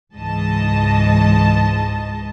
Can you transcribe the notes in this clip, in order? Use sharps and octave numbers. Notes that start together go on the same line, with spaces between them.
C#2 G#2 E3 D#5 A5